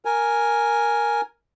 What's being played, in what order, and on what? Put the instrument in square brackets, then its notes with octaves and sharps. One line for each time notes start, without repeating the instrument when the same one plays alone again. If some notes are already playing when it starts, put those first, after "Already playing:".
[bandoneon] A#4 G#5